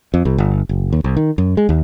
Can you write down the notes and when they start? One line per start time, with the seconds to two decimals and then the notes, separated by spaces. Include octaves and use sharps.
0.14 F2
0.25 C2
0.38 G1
0.69 F#1
0.93 D#2
1.04 C2
1.17 D#3
1.38 F#2
1.57 G#3
1.69 D#2